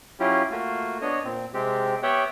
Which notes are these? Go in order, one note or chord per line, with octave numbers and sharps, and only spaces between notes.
F#3 C#4 E4 F4 G4
A3 A#3 F4 F#4
B3 D4 C#5 D#5
A#2 C4
C3 G#3 C4 G4
B3 G4 C#5 E5 F#5 G5